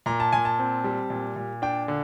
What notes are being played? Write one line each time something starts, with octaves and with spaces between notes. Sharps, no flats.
A#2 A#5
A5
A#2 G#5
A5
C4
G3
A#2
A#2
D4 G5
D3